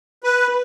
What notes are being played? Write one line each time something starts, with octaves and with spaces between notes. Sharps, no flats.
B4